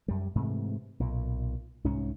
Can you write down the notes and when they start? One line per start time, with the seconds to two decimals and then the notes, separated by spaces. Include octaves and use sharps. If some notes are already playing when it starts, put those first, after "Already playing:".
0.08 F#2 G3
0.35 G#2 C3 E3 A3
1.00 B1 A#2
1.84 C2 G#2 C#4